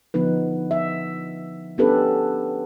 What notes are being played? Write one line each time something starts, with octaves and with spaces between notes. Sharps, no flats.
D3 F3 B3 D#4 B4
E5
B3 C#4 D4 G4 A4 B4